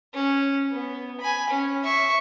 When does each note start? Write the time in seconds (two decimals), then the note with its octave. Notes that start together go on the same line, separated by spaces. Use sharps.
0.14 C#4
0.72 B3
1.20 G#5 B5
1.50 C#4
1.84 E5 C#6